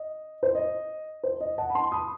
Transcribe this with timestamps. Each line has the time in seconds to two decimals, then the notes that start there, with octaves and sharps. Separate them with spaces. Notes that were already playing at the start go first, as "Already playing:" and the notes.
Already playing: D#5
0.43 C5
0.55 D#5
1.23 C5
1.40 D#5
1.58 F#5 A5
1.70 B5
1.75 A5 C6
1.92 B5 D#6